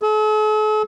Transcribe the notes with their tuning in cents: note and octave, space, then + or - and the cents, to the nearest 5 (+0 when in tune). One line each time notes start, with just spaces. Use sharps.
A4 -45